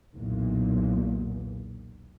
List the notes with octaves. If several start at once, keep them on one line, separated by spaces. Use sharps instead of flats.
B1 E2 A#2